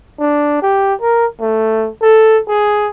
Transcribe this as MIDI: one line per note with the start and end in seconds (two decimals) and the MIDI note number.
0.19 0.61 62
0.62 0.94 67
1.01 1.26 70
1.40 1.89 57
2.02 2.38 69
2.48 2.90 68